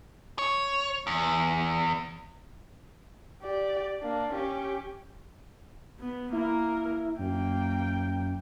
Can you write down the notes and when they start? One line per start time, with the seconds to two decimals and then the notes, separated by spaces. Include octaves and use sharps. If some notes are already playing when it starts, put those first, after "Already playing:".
0.39 C#5
1.07 E2
3.41 G4 D5
4.02 A#3 D4
4.32 C#4 G4
6.00 B3
6.32 A#3 E4 A#4
7.19 F#2 A#3 G5